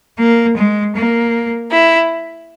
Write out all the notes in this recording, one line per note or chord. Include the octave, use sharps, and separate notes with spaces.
A#3
G#3
A#3
E4